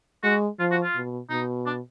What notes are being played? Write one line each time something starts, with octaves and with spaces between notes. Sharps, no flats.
G#3 F#4
F3 F4
F#4
F4
B2
B2 D#4
D4